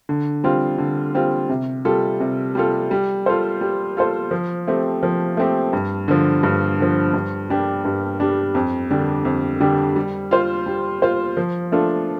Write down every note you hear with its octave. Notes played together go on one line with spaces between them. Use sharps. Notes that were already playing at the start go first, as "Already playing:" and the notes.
D3
G3 C4 F4
D3
G3 C4 F4
C3
G3 F4 A4
C3
G3 F4 A4
G3
F4 A4 C5
G3
F4 A4 C5
F3
A3 C4 G4
F3
A3 C4 G4
G2
D3 F3
G2
D3 F3
G2
G3 D4 G4
G2
G3 D4 G4
F2
D3 G3 D4 G4
F2
D3 G3 D4 G4
G3
F4 C5
G3
F4 C5
F3
A3 D4 F4 A4